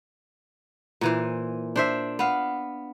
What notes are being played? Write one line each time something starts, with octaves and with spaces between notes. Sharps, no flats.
A#2 E3 C5
D4 C5 E5
B3 F5